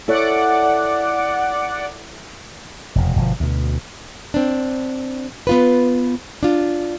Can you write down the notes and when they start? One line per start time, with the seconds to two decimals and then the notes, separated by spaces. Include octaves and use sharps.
0.08 E4 A4 C#5 D5 F#5 D6
2.95 F1 E2 B2
3.17 G1 B2 F3
3.40 D2 B2
4.34 C4 D4
5.47 B3 F4 B4
6.43 D4 F4